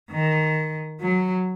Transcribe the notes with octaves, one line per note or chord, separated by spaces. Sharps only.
D#3
F#3